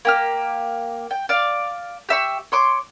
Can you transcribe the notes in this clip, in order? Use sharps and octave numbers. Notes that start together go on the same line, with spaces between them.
A#3 G4 F6
G5
D5 F5
G4 E5 C#6
C#5 C6 D6